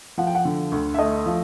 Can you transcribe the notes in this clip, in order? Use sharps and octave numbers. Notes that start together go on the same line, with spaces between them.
F3 F#5
G5
F#5
D3
D2
E5
A3 D#5
F3